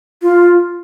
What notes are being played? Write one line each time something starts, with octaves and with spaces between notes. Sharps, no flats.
F4